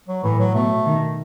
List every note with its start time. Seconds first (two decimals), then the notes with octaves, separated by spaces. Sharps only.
0.08 F#3
0.24 A2 E3
0.39 F#3
0.54 B2 A3
0.86 D#3